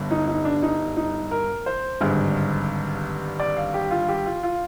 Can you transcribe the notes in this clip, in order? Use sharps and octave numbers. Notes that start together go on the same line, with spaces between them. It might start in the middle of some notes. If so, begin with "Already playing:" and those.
Already playing: G1 G2 D3
D#4
D#4
D4
D#4
D#4
A#4
C5
G#1 G2 D3 G#3
D5
F5
G4
F4
G4
F4
F4